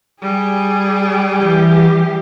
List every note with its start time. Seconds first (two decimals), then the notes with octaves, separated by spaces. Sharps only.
0.22 G3 G#4
1.36 E3 G4